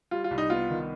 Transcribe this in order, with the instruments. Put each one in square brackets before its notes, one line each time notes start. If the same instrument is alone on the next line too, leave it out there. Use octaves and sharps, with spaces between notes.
[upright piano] G3 [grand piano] F4
[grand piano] F4
[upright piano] C2
[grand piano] D#4
[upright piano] B3 [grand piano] F4
[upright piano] D#3